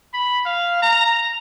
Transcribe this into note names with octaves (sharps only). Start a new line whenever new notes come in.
B5
F5
A#5